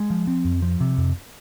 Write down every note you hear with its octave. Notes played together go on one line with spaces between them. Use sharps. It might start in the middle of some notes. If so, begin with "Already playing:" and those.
Already playing: G#3
F3
C4
F2
F3
C3
F2